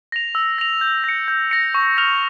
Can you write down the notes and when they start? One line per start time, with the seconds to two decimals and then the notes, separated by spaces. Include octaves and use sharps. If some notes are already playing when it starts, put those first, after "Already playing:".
0.12 A#6 F7
0.35 E6
0.58 A#6 F7
0.81 G6
1.04 A#6 C#7
1.28 G6
1.51 A#6 C#7
1.74 C#6
1.97 F6 A#6 F7